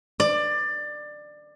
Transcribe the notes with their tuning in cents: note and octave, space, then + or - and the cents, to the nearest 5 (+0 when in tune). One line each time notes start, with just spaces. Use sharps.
D5 +20